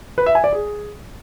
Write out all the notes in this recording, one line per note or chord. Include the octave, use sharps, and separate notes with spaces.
B4
E5
G#5
D5
G#4